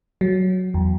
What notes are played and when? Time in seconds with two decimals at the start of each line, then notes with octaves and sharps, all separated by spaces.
0.21 F#3
0.74 E2